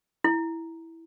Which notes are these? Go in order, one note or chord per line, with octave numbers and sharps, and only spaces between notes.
E4